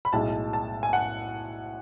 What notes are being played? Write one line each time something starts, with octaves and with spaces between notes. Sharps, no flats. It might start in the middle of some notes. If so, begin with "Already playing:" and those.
B5
B1 A2 G#3 A5
A5
G#5
F#5